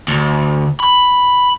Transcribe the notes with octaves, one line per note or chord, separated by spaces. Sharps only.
D2
B5